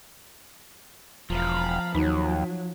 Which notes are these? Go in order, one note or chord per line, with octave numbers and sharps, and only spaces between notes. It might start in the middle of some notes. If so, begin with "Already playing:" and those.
E1 F3 F5 A#5 B5
D#2 F#3 D#4